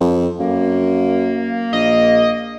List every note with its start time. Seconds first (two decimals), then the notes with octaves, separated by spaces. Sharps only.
0.01 F2
0.40 F#2 A#3
1.73 A#1 D#5